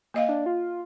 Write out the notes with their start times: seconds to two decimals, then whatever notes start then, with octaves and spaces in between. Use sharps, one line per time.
0.14 A#3 D#5 F5
0.29 D4
0.46 F4